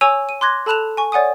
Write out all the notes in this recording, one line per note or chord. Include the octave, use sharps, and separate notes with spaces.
C#5 G#5 C#6 E6 F7
D#7
C6 D6 F#6 G#6 A#6
A4 A5 B5 F#6 E7 F7
G#5 C#6
C#5 D5 F#5 G#5 D#6